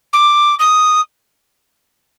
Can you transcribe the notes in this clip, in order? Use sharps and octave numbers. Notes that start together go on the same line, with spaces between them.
D6
D#6